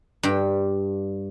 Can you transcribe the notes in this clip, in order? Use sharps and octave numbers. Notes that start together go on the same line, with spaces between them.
G2 G5